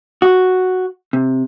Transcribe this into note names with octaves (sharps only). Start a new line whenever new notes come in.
F#4
C3